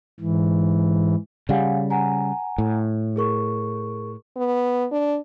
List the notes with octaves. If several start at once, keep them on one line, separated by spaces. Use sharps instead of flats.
G#2 E3
C#3 G3 F5 F#5 G#5
F#5 G#5 A#5
A2
G#4 A#4 C#6
B3
D4